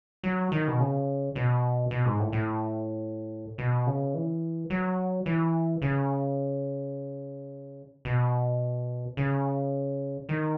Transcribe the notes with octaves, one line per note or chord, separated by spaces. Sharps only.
F#3
D#3
B2
C#3
B2
B2
G#2
A2
A2
B2
C#3
E3
F#3
E3
C#3
B2
C#3
D#3